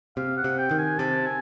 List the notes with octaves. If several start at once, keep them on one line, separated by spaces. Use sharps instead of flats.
C3 F5
F#5
C3
G5
D#3
G#5
C3 A5
G#5